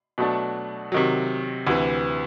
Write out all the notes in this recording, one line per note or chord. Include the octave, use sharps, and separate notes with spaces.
B2 F#3 A3 D4
C3 D#3 F#3
D2 C3 E3